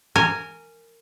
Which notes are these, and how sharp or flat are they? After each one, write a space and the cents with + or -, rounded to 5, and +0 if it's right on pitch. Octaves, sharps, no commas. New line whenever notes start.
A#4 -20 G#5 +0